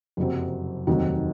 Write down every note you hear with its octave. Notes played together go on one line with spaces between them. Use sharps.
F#1 F2 C3 F#3 C4
F1 D#2 D#3 F#3 C4